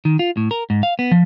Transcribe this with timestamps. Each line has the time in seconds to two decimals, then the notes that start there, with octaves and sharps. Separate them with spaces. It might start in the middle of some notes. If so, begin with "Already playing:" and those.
0.05 D#3
0.19 F4
0.37 A2
0.51 A#4
0.70 G#2
0.83 F5
0.99 B3
1.12 F3